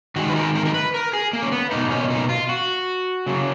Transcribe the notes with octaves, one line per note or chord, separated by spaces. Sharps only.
D#3 G#3 F#4
B4
A#4
A#4
A#4
B4
A#4
G#4
A#3
C#4
B3
B2 A#3 D#4
C#4
D#4
F4
F#4
C#3 F#3 A#3